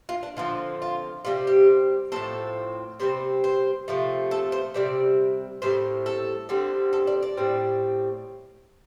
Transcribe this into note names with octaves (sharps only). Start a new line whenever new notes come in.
F4
D4
D3 F3 C4 F4
F4
C3 G3 C4 F4
G4
A2 F3 C4 A4
C3 G3 C4 C5
C5
C3 F3 A3
A4
C5
C3 G3 C4 D5
A2 G3 C4 C5
A4
D3 G3 C4
A4
D5
D5
A2 G3 C4